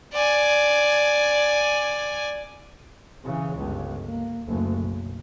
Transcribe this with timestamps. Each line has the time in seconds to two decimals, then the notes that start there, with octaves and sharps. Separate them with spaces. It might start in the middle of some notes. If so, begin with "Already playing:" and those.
0.13 D5 G#5
3.24 C#3 E3
3.56 G1 C#2
4.05 A#3
4.46 F#1 D2
4.80 B1